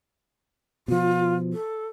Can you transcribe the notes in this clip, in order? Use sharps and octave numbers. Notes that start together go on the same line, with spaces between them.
B2 F3 F4
A4